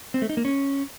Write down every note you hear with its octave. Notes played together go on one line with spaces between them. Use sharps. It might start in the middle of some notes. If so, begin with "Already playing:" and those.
C4
A3
D#4
A#3
C#4